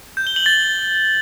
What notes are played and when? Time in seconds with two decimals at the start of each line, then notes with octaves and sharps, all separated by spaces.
0.17 G6
0.27 G7
0.36 F#7
0.46 A6